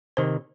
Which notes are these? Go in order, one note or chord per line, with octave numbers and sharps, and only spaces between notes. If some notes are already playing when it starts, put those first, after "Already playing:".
C3 D#3 C5